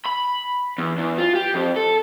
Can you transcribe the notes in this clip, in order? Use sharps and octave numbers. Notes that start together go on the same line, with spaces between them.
B5
E2
E2
F4
G4
F2
A4